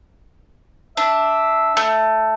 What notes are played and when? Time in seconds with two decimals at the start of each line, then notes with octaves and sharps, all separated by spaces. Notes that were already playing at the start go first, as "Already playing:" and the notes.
0.97 D4 E5
1.77 A3